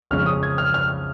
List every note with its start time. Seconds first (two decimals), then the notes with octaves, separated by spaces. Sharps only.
0.11 F2 C#3 G#3 C#4 F6
0.26 D#6
0.43 G#6
0.58 F6
0.74 F6